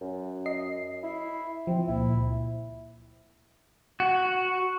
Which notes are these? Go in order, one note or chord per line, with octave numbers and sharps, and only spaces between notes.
F#2
D#5 C7
E4
F3 C4
C#2 A#2 E4
F#4